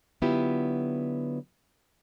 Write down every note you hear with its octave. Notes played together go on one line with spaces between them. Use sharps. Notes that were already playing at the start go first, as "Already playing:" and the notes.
D3 F#3 B3 E4 F4 G4